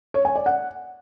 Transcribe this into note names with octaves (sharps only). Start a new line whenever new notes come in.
C#5
G#5
D5
F#5